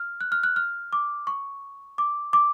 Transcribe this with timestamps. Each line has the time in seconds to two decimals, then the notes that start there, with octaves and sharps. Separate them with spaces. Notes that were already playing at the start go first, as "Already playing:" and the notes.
Already playing: F6
0.21 F#6
0.32 F6
0.43 F#6
0.56 F6
0.93 D6
1.27 C#6
1.98 D6
2.33 D6